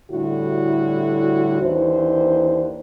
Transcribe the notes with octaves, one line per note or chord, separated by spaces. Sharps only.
A2 D3 G3 E4 F#4
D#2 E3 D4 C5